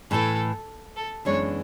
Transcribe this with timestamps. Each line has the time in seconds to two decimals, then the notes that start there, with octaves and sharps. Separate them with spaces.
0.11 A2 E3 A3 E4 A4 B4
0.96 A4
1.25 F#2 E3 G#3 B3 D4 C#5